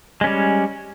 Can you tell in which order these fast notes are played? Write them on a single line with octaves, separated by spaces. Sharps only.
G#3 C#4 G3